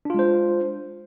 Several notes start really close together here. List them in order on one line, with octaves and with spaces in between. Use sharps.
D4 F4 G#3 C5